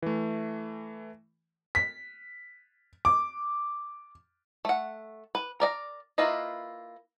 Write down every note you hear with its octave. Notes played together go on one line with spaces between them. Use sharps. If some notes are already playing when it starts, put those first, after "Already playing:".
E3 A3
B6
D6
A3 F#5
B4
A#4 D5 D#5 A#5
A#3 E4 F4 B4 D#5